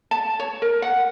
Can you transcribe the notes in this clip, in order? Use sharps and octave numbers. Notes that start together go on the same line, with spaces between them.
A5
C#5
A#4
F#5